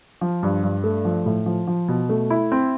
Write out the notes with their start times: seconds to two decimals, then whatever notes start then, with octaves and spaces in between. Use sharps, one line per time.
0.21 F3
0.43 G2
0.63 G2
0.84 A3
1.05 F3
1.26 A2
1.46 F3
1.67 F3
1.88 B2
2.09 A3
2.30 E4
2.52 C4